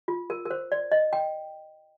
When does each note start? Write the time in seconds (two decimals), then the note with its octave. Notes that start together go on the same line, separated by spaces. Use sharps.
0.08 F4
0.30 A#4
0.45 A#4
0.51 C5
0.72 D5
0.92 D#5
1.13 G5